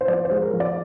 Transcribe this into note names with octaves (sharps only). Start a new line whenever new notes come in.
C5
F3 D5
C5
G#3
A#4
F3
D5